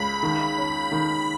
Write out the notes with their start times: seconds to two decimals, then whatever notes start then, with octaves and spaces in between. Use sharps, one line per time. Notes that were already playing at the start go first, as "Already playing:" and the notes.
Already playing: C#2 G#3 B5
0.23 D#3
0.57 C#4
0.92 D#3